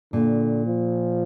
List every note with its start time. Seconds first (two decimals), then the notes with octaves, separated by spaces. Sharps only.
0.13 A#2 D3
0.67 F3